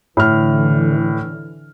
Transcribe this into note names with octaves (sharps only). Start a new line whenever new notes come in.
A2 D3 E3 F6